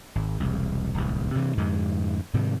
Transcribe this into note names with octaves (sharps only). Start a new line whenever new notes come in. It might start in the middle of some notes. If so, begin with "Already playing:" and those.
G#1
E1 C2
D1 C2
G2 C3 E3
F2 G#2 D3 G#3
G#2 C3 D#3 G3